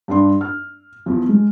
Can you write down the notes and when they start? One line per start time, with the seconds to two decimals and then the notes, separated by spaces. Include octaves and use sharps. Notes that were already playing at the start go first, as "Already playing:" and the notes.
0.08 G2 D4 C6
0.41 F6
1.06 E2 F3
1.29 G#3